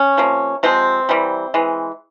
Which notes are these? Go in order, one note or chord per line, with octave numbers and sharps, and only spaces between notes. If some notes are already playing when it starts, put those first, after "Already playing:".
Already playing: C#4
C3 F3 A#3
C3 F3 G#3 C4
C3 E3 G3
E3 G#3